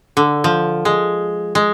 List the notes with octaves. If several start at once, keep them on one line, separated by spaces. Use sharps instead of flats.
D3
F3
G#3
G#3